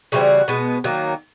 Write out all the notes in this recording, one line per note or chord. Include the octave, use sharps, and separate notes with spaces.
C#3 E3 G3 C4 F#4
B2 G#3 B3
D#3 F#3 A#3